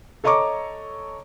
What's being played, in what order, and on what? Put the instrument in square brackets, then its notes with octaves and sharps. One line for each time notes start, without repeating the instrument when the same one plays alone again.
[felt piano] A4 C#5 D#5 A#5 C#6 D6